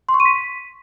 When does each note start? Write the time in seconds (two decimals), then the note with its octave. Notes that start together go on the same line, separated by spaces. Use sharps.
0.09 C6
0.14 C#6
0.20 D#7
0.25 B6